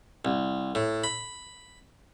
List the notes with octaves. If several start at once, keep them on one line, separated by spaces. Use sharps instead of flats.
C2
A2
B5